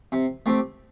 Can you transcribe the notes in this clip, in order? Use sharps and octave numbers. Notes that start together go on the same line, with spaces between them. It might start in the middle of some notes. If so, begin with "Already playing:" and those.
C3
A3 C4 G4